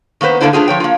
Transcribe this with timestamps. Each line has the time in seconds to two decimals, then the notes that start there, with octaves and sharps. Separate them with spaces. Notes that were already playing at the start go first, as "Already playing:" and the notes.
0.21 D#3 A#3 B3 B4 C5
0.41 D3 A3 A#3 D4 E4 C5
0.53 A3 D4 F4 G#4
0.68 F3 C#5 G5
0.80 A#3 F4